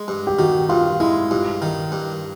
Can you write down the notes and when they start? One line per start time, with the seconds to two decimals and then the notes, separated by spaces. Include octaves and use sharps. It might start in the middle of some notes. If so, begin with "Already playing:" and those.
Already playing: G#3
0.08 G2
0.27 G4
0.39 D#3 F#4
0.69 G2 F4
1.00 G#3 E4
1.31 G2 F4
1.62 D#3
1.92 G2